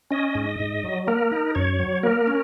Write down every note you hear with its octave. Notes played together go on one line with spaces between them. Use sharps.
C#4 D#5
G#2
G#2
F#3
A#3 A#4
D#4
F#2 C#5
F#3
A#3 A#4
C#4